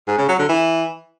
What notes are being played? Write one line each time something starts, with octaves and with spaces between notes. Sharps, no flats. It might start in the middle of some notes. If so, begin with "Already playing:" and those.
G#2
C#3
F#3
D3
E3